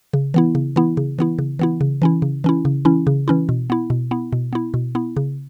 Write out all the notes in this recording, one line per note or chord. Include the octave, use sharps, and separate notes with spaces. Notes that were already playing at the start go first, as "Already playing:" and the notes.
C#3
E3 B3 E4
C#3
E3 B3 E4
C#3
E3 B3 E4
C#3
E3 B3 E4
C#3
E3 C#4 E4
C#3
E3 C#4 E4
C#3
E3 C#4 E4
C#3
E3 C#4 E4
B2
B3 E4
B2
B3 E4
B2
B3 E4
B2
B3 E4
C#3